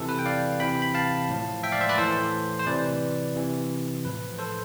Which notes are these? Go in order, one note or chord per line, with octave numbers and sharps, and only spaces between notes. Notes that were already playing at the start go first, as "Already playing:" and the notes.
Already playing: C3 E3 A4
B4
G5
D5 F5
C3 E3 G5 B5
B5
F5 A5
A2 F3
E5 G5
D5 F5
C5 E5
B4 D5
A2 E3 A4 C5
C5
C3 E3 B4 D5
C3 E3
A2 F3 B4
A4 C5